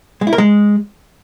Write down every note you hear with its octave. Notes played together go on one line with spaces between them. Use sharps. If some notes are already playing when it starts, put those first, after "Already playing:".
G#3
E4
A#4
G#3